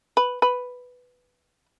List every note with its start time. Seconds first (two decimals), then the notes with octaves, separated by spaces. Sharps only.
0.17 B4
0.42 B4